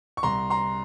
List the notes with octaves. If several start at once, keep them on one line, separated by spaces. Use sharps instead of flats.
C#6
C2 A#5 C6
A#5 C6